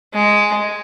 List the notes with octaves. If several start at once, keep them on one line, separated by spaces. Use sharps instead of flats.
G#3